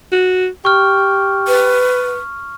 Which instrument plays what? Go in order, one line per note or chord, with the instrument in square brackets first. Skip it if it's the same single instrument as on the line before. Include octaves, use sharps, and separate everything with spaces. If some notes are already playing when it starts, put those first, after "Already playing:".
[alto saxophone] F#4
[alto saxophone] G4 [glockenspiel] C#6 F6
[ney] B4